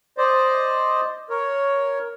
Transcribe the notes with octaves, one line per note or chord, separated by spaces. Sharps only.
C5 D5 D#5
A#4 C#5